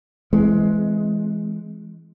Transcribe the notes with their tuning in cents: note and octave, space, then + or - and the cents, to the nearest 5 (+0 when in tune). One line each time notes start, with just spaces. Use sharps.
E3 +10 G#3 +15 C4 +0